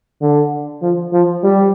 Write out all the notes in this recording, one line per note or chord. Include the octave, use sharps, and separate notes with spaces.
D3
F3
F3
G3